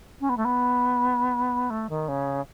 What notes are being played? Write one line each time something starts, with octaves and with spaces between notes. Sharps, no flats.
C#4
B3
A3
B3
A3
D#3
C#3